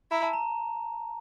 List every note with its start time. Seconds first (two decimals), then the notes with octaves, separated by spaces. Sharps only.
0.11 E4 A#5
0.23 A5
0.33 A#5